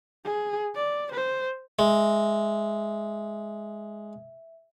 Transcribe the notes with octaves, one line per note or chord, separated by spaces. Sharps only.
G#4
D5
C5
G#3 E5